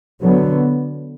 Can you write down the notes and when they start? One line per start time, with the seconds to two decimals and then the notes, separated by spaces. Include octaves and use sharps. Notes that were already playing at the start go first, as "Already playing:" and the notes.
0.20 D3 F#3 B3